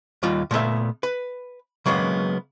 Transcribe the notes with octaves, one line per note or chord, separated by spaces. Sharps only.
D#2 G3 F4
A#2 A3 B3 E5
B4
C#3 F#3 G#3 A#3 B3